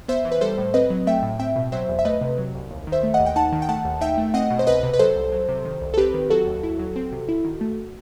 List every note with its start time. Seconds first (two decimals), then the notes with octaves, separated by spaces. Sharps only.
0.08 B3 C5 E5
0.25 E3
0.32 B4
0.41 G3 A4 C5
0.58 A2
0.74 C4 B4 D#5
0.90 F#3
1.07 A3 E5 G5
1.23 A2
1.39 C4 E5 G5
1.56 B2
1.72 F#3 C5 E5
1.89 E2
1.99 E5
2.05 A3 B4 D#5
2.21 C3
2.38 F#3
2.54 C2
2.71 D#2
2.87 D#3
2.92 C5 E5
3.03 A3
3.14 D#5 F#5
3.20 D#2
3.26 G5
3.36 D#4 F#5 A5
3.52 D#3
3.62 G5
3.69 A3 F#5 A5
3.85 D#2
4.01 D#4 E5 G5
4.18 A3
4.34 C4 D#5 F#5
4.51 B2
4.59 C5
4.67 C2 B4 D#5
4.83 C3
4.93 B4
4.99 F#3 A4 C5
5.16 C2
5.32 F#3
5.49 C3
5.65 D#3
5.81 C2
5.94 A4
5.98 C4 G4 B4
6.14 D#3
6.30 F#3 F#4 A4
6.47 D#2
6.63 E4
6.79 F#3
6.96 C4
7.12 C3
7.29 E4
7.45 D#3
7.61 A3